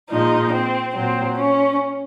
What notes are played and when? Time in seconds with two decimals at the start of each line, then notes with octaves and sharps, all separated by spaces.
0.10 A#2 F3 G#3 D#4
0.52 C4
0.95 A#2 F#3 C4
1.37 C#4